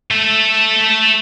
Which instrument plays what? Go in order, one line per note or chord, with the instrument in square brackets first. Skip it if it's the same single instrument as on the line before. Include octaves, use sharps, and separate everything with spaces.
[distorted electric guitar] A3 A4